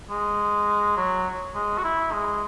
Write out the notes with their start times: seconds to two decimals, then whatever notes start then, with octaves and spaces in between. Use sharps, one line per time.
0.10 G#3
0.97 F#3
1.55 G#3
1.78 F#4
1.84 E4
2.12 G#3